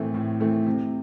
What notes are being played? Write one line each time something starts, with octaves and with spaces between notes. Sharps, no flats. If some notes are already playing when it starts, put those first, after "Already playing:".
Already playing: A2 E3 A3 C4
A2
E3 A3 C4
C3